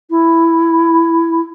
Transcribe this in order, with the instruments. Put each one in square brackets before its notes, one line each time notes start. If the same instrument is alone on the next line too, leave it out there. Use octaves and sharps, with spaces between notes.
[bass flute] E4